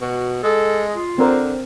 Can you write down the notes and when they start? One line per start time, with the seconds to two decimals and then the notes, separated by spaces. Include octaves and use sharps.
0.01 B2 F#4
0.44 G#3 A4
0.93 F4
1.18 D3 C4 A#4 C5